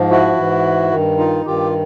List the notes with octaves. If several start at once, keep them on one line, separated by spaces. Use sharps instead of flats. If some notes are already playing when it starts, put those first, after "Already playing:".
Already playing: G#2 F3
E4 F#4
G#2 E3
G2 D#3
D#4 F4
G2 D#3 F4 G4